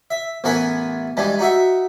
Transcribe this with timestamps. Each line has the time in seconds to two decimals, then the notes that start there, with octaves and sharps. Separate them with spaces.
0.11 E5
0.44 A1 E3 B3 A#4 B4 G#5
1.17 G2 E3 G3 G#3
1.39 D#4 F#4 E5